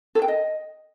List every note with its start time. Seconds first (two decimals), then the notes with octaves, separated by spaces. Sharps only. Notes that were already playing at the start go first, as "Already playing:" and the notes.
0.15 A4
0.22 G5
0.28 D#5